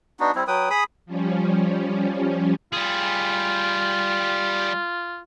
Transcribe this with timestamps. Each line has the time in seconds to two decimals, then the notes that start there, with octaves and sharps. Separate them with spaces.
0.20 B3 D4 D#4 F#4
0.35 G3 C4 E4
0.48 F#3 B4 G5 D#6
0.70 G#4 B5 D#6
1.06 F3 G3 C#4
2.73 G3 F4 G#4